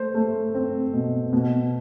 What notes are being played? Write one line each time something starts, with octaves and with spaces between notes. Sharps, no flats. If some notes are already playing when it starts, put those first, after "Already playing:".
Already playing: A3 C5
A3
C4
B2
B2